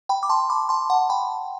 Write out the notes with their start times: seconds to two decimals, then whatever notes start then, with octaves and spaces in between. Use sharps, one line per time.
0.09 G5 B5
0.23 D6
0.29 A5 C6
0.50 B5 D6
0.69 A5 C6
0.90 F#5 A5
1.10 G5 B5